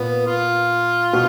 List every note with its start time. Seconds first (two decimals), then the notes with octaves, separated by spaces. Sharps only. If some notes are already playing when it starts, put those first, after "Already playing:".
Already playing: A#2 B3
0.27 F4
1.13 B2